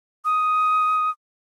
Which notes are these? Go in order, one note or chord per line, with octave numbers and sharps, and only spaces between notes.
D#6